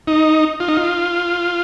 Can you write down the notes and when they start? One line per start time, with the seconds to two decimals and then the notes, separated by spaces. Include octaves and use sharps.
0.07 D#4
0.60 F4
0.68 D#4
0.77 F4